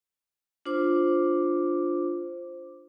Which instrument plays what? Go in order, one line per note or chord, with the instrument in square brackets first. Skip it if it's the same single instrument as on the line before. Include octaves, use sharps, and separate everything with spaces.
[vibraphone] D4 F4 C5 D6